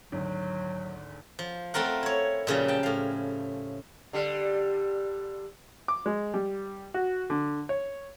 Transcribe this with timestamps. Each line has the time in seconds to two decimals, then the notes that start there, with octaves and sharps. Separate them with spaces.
0.12 G#1 D2 F#3
1.39 F3
1.74 A3 C4 F4 A#4 F#5
2.03 E4 C#5
2.47 A#2 C#3 F3 G3
2.68 G5 A5
2.83 A2 F5
4.13 D3 G3
5.88 D6
6.06 G#3
6.34 G3
6.94 F#4
7.30 D3
7.69 C#5